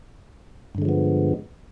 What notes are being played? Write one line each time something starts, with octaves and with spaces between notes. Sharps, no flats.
G2 D3 F3 G#3 B3